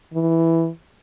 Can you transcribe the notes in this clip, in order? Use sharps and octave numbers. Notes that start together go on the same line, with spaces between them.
E3